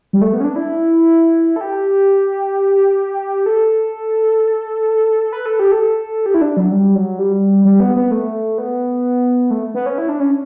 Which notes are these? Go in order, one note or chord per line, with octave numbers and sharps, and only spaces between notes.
G3
A3
B3
C#4
D4
E4
A4
G4
A4
B4
A4
G4
A4
G4
E4
D4
F#3
G3
F#3
G3
G3
B3
B3
A3
B3
A3
B3
C#4
E4
D4
C#4